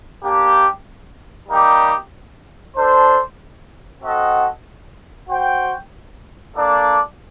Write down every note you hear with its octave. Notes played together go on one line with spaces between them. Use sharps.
A#3 D4 G4
G3 A#3 D#4 G4
D4 A4 C5
C4 F#4 A4 D#5 F#5
F#4 C5 G5
A#3 D4 A4 D5